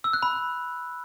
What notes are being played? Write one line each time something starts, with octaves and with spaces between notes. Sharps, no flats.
E6
F#6
B5